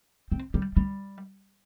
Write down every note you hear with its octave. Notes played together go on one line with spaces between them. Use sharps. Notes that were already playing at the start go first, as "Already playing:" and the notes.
C4
G3
G3